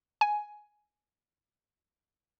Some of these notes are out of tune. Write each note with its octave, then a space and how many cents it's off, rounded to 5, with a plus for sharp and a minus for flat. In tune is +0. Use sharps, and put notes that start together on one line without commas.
G#5 +10